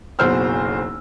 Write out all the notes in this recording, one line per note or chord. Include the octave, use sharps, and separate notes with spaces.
F#1 B1 F#4 C5 E6 F6